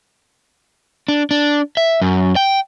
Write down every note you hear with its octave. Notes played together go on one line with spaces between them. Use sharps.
D4
D4
E5
F#2
G5